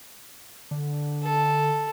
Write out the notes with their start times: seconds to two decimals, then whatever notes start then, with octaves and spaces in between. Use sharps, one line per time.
0.71 D3
1.23 A4